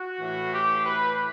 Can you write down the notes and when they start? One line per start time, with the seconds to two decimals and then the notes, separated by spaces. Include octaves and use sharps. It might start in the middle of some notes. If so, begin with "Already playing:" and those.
Already playing: F#4
0.19 A2 E3
0.52 G4
0.84 B4